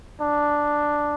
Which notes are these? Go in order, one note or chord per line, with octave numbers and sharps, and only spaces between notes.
D4